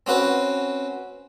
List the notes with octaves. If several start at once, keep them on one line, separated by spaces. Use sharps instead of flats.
C4 C#4 F#4 B4